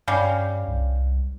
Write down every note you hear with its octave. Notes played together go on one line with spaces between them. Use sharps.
G2 G3 C#4 F5
C2